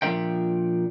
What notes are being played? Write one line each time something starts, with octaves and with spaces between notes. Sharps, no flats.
A#2 F3 D4 A#4 E5 G5